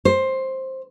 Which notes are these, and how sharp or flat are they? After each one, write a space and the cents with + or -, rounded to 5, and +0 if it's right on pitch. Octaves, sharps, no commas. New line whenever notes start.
C5 +10